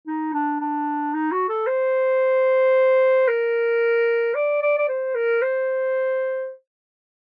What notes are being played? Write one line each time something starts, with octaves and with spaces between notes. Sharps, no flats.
D#4
D4
D4
D#4
F#4
A4
C5
A#4
D5
D5
D5
C5
A#4
C5